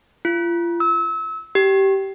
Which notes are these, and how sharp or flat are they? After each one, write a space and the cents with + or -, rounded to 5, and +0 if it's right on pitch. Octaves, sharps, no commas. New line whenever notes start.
F4 -35
E6 -30
G4 -15